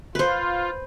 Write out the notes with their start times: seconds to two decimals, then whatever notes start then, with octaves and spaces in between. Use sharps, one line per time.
0.15 F4 B4 C5